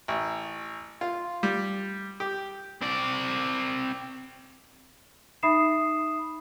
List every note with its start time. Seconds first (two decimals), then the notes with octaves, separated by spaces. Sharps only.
0.08 A1
1.01 F4
1.43 G3
2.20 G4
2.82 C4 D5
5.43 D#4 E5 B5 D#6 C7 E7